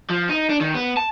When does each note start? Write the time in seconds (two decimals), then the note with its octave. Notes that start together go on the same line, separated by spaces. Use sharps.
0.10 F3
0.29 D#4
0.50 D4
0.61 D#3
0.74 B3
0.97 A5